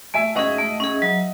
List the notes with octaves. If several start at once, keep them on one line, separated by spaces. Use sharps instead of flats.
A3 E5 G#5
C#4 G#4 D#5 F#5
A3
C#4 G#4
F#3